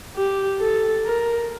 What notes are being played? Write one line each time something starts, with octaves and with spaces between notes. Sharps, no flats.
G4
A4
A#4